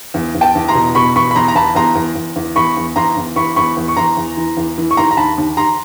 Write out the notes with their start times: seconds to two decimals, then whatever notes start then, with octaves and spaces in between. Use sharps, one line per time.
0.14 E2
0.35 E2
0.41 G5 A5
0.55 E2
0.68 A#5 C6
0.75 B2
0.95 B2 B5 C#6
1.16 E2 B5 C#6
1.31 B5
1.35 E2 A#5 C6
1.48 A#5
1.55 E2 A5 B5
1.75 E2 A#5 C6
1.95 E2
2.15 E2
2.36 E2
2.56 E2 B5 C#6
2.77 E2
2.96 E2 A#5 C6
3.17 E2
3.36 E2 B5 C#6
3.56 E2 B5 C#6
3.77 E2
3.88 C#6
3.97 E2 A#5 C6
4.17 E2
4.37 E3
4.57 E2
4.78 E3
4.91 C#6
4.97 D#2 A#5 C6
5.11 A#5
5.17 D#2 A5 B5
5.38 D#2
5.57 D#2 A#5 C6